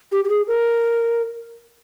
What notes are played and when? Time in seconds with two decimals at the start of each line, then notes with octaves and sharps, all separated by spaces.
0.12 G4
0.25 G4
0.29 G#4
0.48 A#4